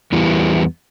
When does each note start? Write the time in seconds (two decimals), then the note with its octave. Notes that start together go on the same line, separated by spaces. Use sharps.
0.12 E2 E3 G3 B3